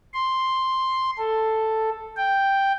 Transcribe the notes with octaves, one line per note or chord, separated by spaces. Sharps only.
C6
A4
G5